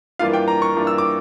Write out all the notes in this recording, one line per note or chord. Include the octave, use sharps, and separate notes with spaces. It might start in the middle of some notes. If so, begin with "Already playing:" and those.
G2 E3 A#3 D4 F4 F5
G5
A#5
C#6
G2 E3 A#3 D4 F4
E6
D6